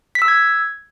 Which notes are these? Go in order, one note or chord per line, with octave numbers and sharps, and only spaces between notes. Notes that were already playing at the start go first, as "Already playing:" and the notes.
B6
E6
G#6